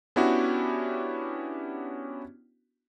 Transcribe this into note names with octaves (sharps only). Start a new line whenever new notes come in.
B3 C#4 D4 E4 F#4 G4